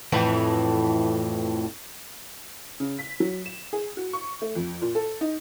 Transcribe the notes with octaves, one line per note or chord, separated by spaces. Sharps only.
F2 A2 E3
C#3
B6
F#3
E7
G#4
F#4
C#6
A3
F2
A#2
A4
D#4